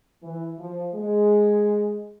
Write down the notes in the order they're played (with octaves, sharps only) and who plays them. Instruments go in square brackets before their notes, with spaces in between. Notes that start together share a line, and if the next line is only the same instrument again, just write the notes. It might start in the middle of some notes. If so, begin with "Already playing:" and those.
[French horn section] E3
F3
G#3